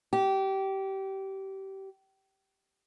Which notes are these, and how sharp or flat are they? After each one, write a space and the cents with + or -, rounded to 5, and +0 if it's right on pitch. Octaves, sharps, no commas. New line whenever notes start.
G4 -25